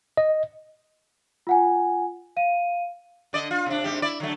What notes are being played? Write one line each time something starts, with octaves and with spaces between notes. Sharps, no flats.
D#5
F4 F#5 G#5
F5 D#7
D3 D5 D#5
F4
C3 D4
G#2 C3 G4
E4 D5
D3 F#3 A3